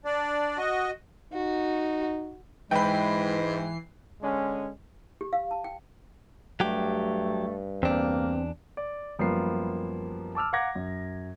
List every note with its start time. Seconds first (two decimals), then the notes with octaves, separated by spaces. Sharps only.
0.05 D4 D5
0.58 F#4 D#5
1.32 D#4 F#4
2.71 G#2 E3 G#3 B4 G5 C7
4.21 D3 G#3 C#4
5.21 G4
5.33 F5
5.51 A5
5.64 G5
6.60 G2 F#3 A3 G4
7.83 E2 A#3 C4 D4
8.77 D5
9.19 F#2 F3 G3 A#3 B3 C7
10.35 A5 D6 E6 F6
10.53 F5 F#5 A#5 D6 G#6 A#6
10.75 F#2